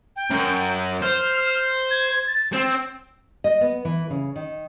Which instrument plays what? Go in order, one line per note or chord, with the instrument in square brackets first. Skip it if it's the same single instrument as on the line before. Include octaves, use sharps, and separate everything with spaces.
[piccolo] G5
[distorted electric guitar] F#2
[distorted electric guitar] C5 [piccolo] F6
[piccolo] G#6
A6
[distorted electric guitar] C4
[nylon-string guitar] D#5
B3
E3
C#3
D#3